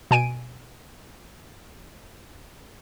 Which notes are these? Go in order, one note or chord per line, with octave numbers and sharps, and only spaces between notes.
B2 G#5 D7 D#7